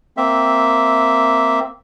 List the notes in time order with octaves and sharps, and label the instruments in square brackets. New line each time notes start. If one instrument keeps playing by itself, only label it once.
[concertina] A#3 C4 E5